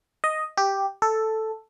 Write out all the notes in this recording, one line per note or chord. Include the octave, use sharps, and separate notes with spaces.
D#5
G4
A4